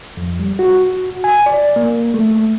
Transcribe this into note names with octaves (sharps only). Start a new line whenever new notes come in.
F2
G3
F#4
G#5
D5
A#3
A3